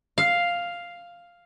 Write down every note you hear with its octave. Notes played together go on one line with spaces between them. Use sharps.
F5